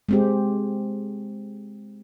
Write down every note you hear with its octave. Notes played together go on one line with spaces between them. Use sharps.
G#3 C4 G4